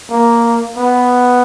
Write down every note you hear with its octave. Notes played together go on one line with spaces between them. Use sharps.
A#3
B3